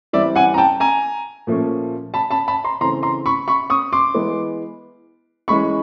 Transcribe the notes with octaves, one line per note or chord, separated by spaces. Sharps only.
E3 G3 C4 D5 E5
F#5 G#5
A#5
G5 A5
G#5 A#5
A#2 F3 A3 C#4
A5 B5
A5 B5
A5 B5
A#5 C6
C#3 E3 A3 C4 A#5 C6
A#5 C6
B5 C#6
B5 C#6
C#6 D#6
C6 D6
E3 G#3 B3
E3 G#3 C#4 B5 C#6